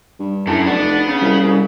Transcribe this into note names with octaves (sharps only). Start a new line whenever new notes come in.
G2
F#2 E4 A4
F1 B3 D4
C#3
C2 G3
C2